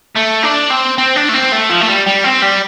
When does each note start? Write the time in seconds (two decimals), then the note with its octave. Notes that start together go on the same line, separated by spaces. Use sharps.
0.16 A3
0.44 D4
0.71 C4
0.98 C4
1.16 D4
1.29 A3
1.34 C4
1.52 A3
1.70 F3
1.81 A3
1.88 G3
2.06 G3
2.24 C4
2.42 G3